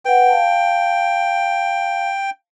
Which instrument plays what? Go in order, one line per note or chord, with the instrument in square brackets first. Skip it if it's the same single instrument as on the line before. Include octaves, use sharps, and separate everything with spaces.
[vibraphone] B4 F#5 [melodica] G5
[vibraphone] F5 A5